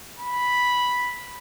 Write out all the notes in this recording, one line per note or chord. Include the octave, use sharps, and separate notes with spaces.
B5